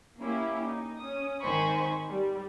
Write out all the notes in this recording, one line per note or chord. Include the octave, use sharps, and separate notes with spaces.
A#3 C#4 E4 G4
D#4
C#4 D#6
G#1 D#3 C5 G#5 B5 C#6
G3